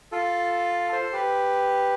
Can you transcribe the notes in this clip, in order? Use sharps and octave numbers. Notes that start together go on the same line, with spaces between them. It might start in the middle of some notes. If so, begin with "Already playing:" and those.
F4 A4
A4 C5
G4 B4